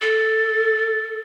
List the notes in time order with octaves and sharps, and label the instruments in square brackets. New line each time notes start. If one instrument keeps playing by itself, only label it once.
[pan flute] A4 [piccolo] A6